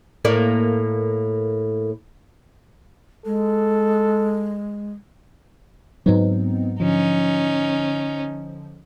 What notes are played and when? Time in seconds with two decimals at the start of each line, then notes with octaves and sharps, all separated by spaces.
0.25 A2 A#3 D5
3.26 G#3 A4
6.06 G#2 F#3 B3 C4 D#4
6.80 D3 F3 C#4 D#4